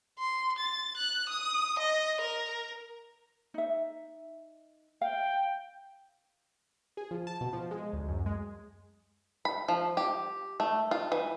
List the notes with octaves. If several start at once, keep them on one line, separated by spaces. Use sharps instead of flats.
C6
A6
F#6
D#6
D#5
A#4
D#4 E5
F5 G5
G#4
F3
A5
B2
F3
G#3
D2
F#2
G#3
B5
F3
G4
A3
F4
E3